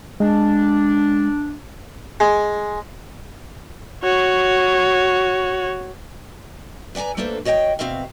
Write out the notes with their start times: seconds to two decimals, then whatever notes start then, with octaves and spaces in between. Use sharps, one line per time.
0.20 G#3 D4
2.20 G#3
4.03 F#4 C#5
6.95 B4 D5 F#5 G#5 A#5
7.17 A3 A#3 D4 A4 B4 C5
7.45 F#4 C#5 D#5 E5 G5
7.79 B2 F3 C4 F#4 E5 F5